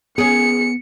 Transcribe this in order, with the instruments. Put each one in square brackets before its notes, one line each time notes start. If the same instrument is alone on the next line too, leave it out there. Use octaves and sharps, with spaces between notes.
[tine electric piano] B3 [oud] C#4 G#4 [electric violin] C#7